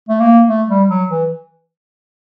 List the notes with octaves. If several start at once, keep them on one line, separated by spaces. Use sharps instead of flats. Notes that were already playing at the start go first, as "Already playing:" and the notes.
A3
A#3
A3
G3
F#3
E3